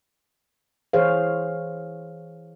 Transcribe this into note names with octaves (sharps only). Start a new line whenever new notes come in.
E3 G#4 C5 C#5 F5